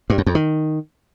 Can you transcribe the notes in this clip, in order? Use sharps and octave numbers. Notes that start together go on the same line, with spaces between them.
G2
F#2
F2
D#3